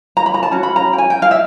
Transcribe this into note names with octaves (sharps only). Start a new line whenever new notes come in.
A#5
B5
A#5
A5
C#4 F#4
B5
A#5
G5
G#5
G5
F5
E5